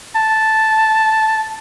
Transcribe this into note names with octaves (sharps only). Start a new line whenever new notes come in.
A5